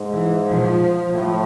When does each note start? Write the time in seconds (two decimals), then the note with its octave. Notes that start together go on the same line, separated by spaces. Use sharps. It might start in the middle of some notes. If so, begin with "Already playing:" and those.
Already playing: G#2
0.13 E3
0.47 F3
1.15 A2 F3